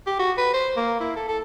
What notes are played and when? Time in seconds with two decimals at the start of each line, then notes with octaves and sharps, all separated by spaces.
0.07 G4
0.19 F#4
0.38 B4
0.54 C5
0.77 A#3
1.00 E4
1.16 A4
1.28 A4